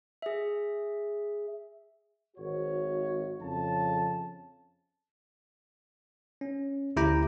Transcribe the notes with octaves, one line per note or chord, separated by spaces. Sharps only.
G#4 E5
G#1 F#4 C#5
F2 C#3 A5
C#4
D2 E4 G4 G5 A#5